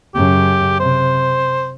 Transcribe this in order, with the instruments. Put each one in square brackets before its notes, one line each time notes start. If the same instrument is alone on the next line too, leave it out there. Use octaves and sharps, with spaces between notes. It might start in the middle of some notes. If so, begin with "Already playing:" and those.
[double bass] F#2 C#3 [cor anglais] G4
[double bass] C3 [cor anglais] C5